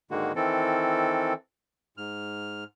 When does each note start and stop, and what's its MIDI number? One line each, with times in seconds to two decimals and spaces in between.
0.11 0.32 44
0.11 0.32 50
0.11 0.32 51
0.11 0.32 56
0.11 0.32 58
0.11 0.32 66
0.35 1.33 51
0.35 1.33 52
0.35 1.33 60
0.35 1.33 69
1.97 2.64 44
1.97 2.64 89